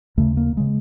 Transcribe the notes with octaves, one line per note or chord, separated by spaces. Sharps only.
D#2 C#3 A3
A#3
C#3 G#3